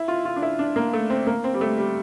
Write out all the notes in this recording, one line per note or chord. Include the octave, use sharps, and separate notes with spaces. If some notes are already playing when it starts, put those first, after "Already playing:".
Already playing: E4
F4
F4
D4
E4
D4
A#3
A3
C4
A#3
C4
G3
A3
G3